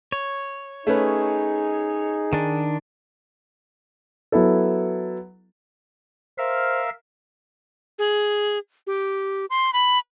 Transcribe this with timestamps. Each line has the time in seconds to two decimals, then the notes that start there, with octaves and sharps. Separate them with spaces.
0.12 C#5
0.87 A3 C#4 D#4 G#4 B4
2.33 D#3 D4
4.32 F#3 B3 E4 A4
6.38 A#4 C5 E5 F5
7.99 G#4
8.87 G4
9.50 C6
9.73 B5